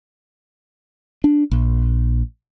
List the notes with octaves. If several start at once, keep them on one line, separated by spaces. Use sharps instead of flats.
D4
A#1